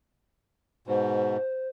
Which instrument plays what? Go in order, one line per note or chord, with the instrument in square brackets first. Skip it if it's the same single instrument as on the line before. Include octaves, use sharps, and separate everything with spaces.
[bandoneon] G#2 B2 [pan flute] C5